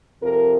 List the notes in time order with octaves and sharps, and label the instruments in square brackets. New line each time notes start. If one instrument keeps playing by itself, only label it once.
[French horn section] F2 C3 F3 A#4